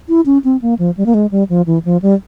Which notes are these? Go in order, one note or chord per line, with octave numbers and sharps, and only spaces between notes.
E4
C#4
C4
A#3
F3
G3
A#3
G#3
G3
F3
E3
F3
G3